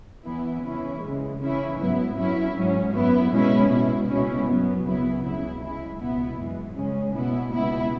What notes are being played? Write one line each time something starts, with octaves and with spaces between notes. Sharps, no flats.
E2 E3 B3 E4
C#3 E3 C#4 E4
C#3 E3 G#3
C#3 E3 C#4 E4
G#2 F#3 B3 E4
F#2 F#3 C#4 E4
G#2 F#3 C#4
F#2 F#3 B3 E4
B2 G#3 C#4 E4
B2 G#3 E4
C#2 B2 G#3 C#4 E4
F#2 F#3 B3
C#2 C#3 F#3 B3 E4
C#2 C#3 F#3 E4
C#3 G#3 E4
C#2 B2 B3 E4
F#2 E3 G#3
C#3 G#3 C#4
B2 B3 E4
C#2 B2 B3 E4